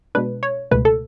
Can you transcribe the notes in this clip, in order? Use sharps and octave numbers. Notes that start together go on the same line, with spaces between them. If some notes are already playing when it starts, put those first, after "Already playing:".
B2 G#3 D4 B4
C#5
C#2 B2 A3 B4
A4